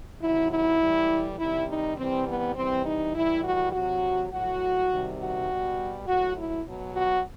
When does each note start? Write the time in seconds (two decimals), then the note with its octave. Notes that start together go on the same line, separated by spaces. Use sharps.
0.22 C3 D#3 F#3 E4
0.51 E4
0.81 A2 E3 G3
1.39 C3 D#3 G3 E4
1.68 D#4
1.98 C3 E3 G3 C4
2.27 B3
2.56 C3 E3 G3 C4
2.85 D#4
3.15 A2 E3 G3 E4
3.44 F#4
3.73 C3 F#3 F#4
4.32 A2 F#3 F#4
4.91 C3 D#3 G3
5.19 F#4
5.48 B2 G3
6.07 A2 F#3 F#4
6.37 E4
6.66 B2 F#3
6.95 F#4